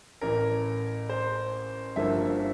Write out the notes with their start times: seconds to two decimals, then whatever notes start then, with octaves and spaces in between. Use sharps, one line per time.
0.21 A1 A2 E3 A#4
1.09 C5
1.96 G1 G2 F3 A#3 E4 E5